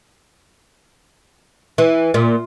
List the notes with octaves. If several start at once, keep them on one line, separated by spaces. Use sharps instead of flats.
E3
A#2